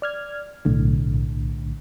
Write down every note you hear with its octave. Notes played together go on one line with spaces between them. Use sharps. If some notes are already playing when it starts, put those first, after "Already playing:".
D5 F6 G#6
B1 A2 D3